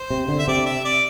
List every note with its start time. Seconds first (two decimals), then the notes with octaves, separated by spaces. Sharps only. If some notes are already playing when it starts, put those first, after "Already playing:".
Already playing: C5
0.10 C3
0.28 D3
0.39 E5
0.48 C3 D5
0.66 E5
0.85 D5